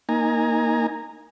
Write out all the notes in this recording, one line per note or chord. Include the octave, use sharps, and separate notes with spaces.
A#3 D#4 G#5 A#5